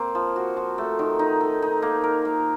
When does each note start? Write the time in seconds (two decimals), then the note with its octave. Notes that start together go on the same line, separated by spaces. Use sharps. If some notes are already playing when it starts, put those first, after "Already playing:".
Already playing: A#3 C4
0.15 F3
0.36 F#4
0.57 F3
0.78 A3
0.99 D#3
1.19 D#4
1.41 A4
1.62 D#4
1.82 A#3
2.04 A#4
2.25 A#3